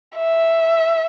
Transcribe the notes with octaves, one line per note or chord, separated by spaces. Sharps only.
E5